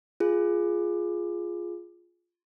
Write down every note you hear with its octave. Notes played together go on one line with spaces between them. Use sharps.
F4 G#4